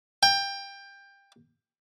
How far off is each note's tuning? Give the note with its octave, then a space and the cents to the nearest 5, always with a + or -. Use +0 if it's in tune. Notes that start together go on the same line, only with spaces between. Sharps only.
G5 +20